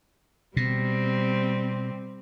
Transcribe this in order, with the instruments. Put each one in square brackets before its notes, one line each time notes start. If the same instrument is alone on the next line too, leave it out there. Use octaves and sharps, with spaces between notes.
[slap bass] B2 [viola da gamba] G3 C4